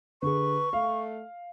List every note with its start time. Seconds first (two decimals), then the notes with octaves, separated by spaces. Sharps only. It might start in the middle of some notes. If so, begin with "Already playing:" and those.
0.23 D3 G#4 B4 C#6
0.73 A3 F5